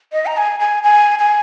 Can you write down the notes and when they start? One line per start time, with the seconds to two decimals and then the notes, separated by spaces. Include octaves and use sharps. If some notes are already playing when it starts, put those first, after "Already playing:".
0.12 D#5
0.26 A#5
0.37 G#5
0.60 G#5
0.83 G#5
1.19 G#5